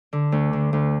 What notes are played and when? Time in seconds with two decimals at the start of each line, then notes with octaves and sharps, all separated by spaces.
0.13 D3
0.32 D2
0.53 D3
0.73 D2